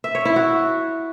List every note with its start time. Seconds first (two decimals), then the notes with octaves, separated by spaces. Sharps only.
0.04 E5
0.15 C#5
0.25 E4
0.36 F#4